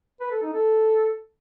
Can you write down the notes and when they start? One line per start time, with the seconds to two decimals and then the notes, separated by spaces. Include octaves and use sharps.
0.20 B4
0.31 A4
0.42 D#4
0.53 A4